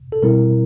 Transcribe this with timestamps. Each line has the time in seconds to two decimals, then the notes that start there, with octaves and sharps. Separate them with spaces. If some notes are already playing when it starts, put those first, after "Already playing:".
0.12 A4
0.22 B2 G3 C4 E4 A#4